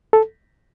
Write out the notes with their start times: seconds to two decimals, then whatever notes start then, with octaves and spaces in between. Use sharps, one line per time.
0.13 A4